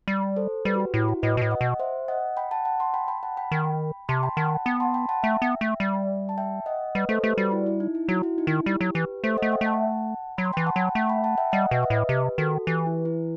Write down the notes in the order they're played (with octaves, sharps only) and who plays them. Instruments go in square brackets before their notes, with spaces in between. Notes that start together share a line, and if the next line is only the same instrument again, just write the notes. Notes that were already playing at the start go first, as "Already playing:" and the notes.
[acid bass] G3
[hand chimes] A4 C5
[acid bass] G3 [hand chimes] G4 B4
[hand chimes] F#4
G4
[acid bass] A2 [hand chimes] E4
[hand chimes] F#4
[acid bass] A2 [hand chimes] B4 D#5
[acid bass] B2
A2
[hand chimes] D#5 F#5
[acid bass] B2
[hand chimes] C5 E5
D#5 F#5
G5 B5
F#5 A5
F#5 A5
A5 C6
G5 B5
G5 B5
F#5 A5
G5 B5
[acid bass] D#3
[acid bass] C3 [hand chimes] A5 C6
[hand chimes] G5 B5
[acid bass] D#3 [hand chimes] F#5 A5
[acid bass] B3 [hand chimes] G5 B5
[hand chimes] A5 C6
G5 B5
F#5 A5
[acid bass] A3 [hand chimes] E5 G5
[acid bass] B3
A3
G3
[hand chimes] A5
E5 G5
D#5 F#5
[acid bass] G3 [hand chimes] B4 D#5
[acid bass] A3 [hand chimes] A4 C5
[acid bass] A3 [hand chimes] G4 B4
[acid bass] G3 [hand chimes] F#4
[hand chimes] E4
E4
D#4
E4
[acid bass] F#3 [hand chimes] F#4
[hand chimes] E4
D#4
[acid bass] D#3
[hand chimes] E4
[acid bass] G3 [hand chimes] G4
[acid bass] F#3
[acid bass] E3 [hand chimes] G4 B4
[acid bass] A3 [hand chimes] A4 C5
[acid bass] A3 [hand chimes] D#5 F#5
[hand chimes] E5 G5
[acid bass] A3
[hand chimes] F#5 A5
[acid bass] F#3 [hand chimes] B5
[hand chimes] C6
[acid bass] E3 [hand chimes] G5 B5
[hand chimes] F#5 A5
[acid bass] F#3
[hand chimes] G5
[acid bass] A3 [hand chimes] F#5 A5
[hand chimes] G5 B5
F#5 A5
E5 G5
[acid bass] G3 [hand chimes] D#5 F#5
[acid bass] B2 [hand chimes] B4 D#5
[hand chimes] E5
[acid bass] A2 [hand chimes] B4 D#5
[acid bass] C3 [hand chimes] G4 B4
[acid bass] D#3 [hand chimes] F#4 A4
[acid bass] E3 [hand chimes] G4
[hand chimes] E4
E4